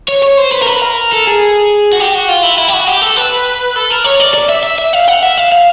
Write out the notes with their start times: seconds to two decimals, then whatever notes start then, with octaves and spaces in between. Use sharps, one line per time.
0.09 C#5
0.23 C#5
0.38 C5
0.52 B4
0.63 A#4
0.67 B4
0.82 A#4
1.12 A4
1.27 G#4
1.93 F#4
2.00 G4
2.14 F#4
2.29 F4
2.43 E4
2.58 E4
2.68 G4
2.73 F#4
2.87 G4
3.02 A4
3.17 B4
3.76 A4
3.90 A#4
4.04 C#5
4.20 D5
4.34 D5
4.49 E5
4.63 E5
4.79 E5
4.93 F5
5.08 F#5
5.23 E5
5.38 F5
5.52 F5